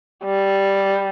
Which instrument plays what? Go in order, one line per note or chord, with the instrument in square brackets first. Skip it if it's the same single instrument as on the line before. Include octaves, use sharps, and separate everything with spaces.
[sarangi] G3